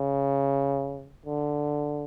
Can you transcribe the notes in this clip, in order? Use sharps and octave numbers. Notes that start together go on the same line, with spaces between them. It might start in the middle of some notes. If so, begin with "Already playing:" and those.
Already playing: C#3
D3